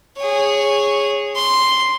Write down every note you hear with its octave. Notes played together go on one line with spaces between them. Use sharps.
G#4 C#5
C6